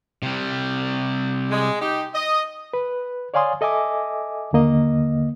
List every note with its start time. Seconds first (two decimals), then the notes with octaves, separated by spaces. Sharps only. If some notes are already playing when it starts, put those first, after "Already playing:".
0.23 C3 G3
1.51 G#3
1.82 D#4 G4
2.14 D#5
2.74 B4
3.34 C#5 D5 F5 G#5 C6 D#6
3.61 A4 D#5 E5 G#5 D6
4.53 D#2 D3 A#3 D#5